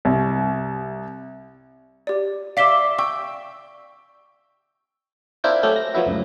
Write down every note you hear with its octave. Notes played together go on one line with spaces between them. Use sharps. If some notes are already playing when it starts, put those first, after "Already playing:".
C2
G4 D5
D5 E5 F5 B6 G7
G5 C#6 E6
C4 D4 E4 F4 A#4 G5
F#3 A3 C4 C#4 G4 A4
A#6
F3 F#3 B3 E4 F#4
C#2 F#2 A2